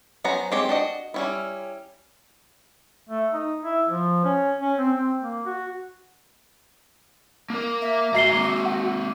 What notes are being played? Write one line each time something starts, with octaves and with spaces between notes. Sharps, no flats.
F#3 B3 C#4 C5 A#5
G#3 C4 G4 C#5
D4 F#4 D#5
G3 C#4 E4
A3
D#4
E4
F3
C#4
C#4
C4
C4
A#3
F#4
A#3 A#4
E5
G#2 F#4 E5 A#5 C7 G7
G#3 A#3
F#5